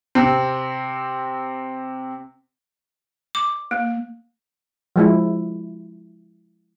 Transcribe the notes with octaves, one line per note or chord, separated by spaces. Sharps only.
C3 C4
D6
A#3
F3 G#3 E4